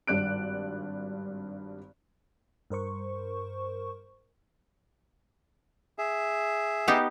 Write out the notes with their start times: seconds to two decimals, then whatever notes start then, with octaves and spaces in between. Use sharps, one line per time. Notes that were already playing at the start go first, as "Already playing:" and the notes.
0.07 G#1 G2 D5 F#6 D7
2.70 G2 A#4 C5 C#6
5.98 G#4 E5
6.88 B3 D#4 G4